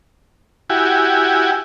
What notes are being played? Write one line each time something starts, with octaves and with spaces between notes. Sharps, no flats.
E4 F#4 G4 G#5